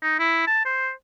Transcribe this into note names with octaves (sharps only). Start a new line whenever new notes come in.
D#4
E4
A5
C5